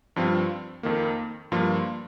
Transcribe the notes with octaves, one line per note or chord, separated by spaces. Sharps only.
G2 F3 C4 F4
F2 D#3 A#3
G2 F3 A#3 F4